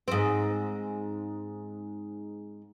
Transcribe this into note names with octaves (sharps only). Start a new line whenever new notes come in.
G#2 C4